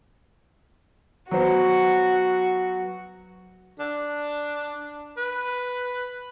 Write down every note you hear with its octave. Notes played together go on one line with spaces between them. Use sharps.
F#3 B3 F#4 C5
D4
B4